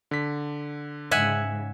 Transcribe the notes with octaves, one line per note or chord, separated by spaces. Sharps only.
D3 B6
G#2 C#3 E5 F#5 G#5